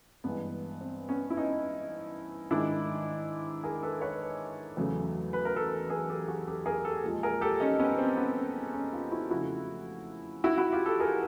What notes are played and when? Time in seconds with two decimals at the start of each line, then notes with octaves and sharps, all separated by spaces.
0.24 G2 E3 G#3 B3
0.81 C4
1.09 B3 C#4
1.30 E4
1.37 C#4 D#4
2.50 G#2 D#3 G#3 D4 E4
3.63 G#4 A#4
3.83 A4 B4
4.01 B4 C#5
4.77 E2 C#3 F#3 A3
5.33 B4
5.45 A#4
5.56 A4 B4
5.90 G#4 A#4
6.09 G4 A4
6.28 F#4 G#4
6.47 G4 A4
6.66 G#4 A#4
6.85 G4 A4
7.04 A#2 F3 G#3
7.23 G#4 A#4
7.41 G4 A4
7.60 C#4 D#4
7.79 B3 C#4
7.98 C4
8.17 B3 C#4
8.73 C#4 D#4
8.92 D#4 F4
9.11 E4 F#4
9.30 F2 C#3 F3 A3 E4 F#4
10.44 E4 F#4
10.58 E4 F#4
10.73 F4 G4
10.86 G4 A4
11.00 G#4 A#4